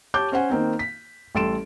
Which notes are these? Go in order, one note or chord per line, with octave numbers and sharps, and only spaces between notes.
G4 C#5 A5 D6 G6
C#4 C5 F#5 G#5
D#3 A#3 C4 D#4
B6
A1 G3 A4 C6 D7 E7